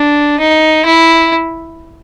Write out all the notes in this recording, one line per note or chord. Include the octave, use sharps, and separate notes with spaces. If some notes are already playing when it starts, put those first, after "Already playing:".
Already playing: D4
D#4
E4